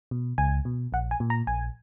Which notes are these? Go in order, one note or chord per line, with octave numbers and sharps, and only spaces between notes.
B2
C#2 G#5
B2
A#1 F#5
G#5
A#2
A#5
A#1 G#5